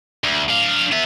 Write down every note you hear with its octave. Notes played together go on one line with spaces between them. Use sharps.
D2
D4 F5
B3 E5